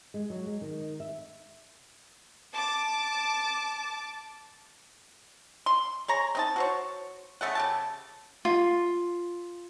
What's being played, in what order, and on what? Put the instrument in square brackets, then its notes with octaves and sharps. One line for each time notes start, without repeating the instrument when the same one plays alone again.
[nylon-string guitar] G#3
F#3
G#3
D#3
E5
[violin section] A5 D6
[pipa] C6
G#4 C#5 A#5
C4 D#4 A5
F#4 C5 C#5
C#3 A3 A4 F#5
C#3 G4 A5
[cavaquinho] F4